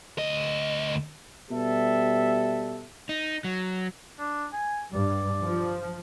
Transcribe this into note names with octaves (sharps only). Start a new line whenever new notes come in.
D2 D#5
B2 G3 G4 A4 E5
D#4
F#3
D4
G#5
G2 D5
F3